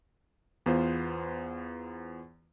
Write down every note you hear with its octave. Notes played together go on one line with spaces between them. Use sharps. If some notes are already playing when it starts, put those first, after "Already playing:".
E2 B3 F4 C5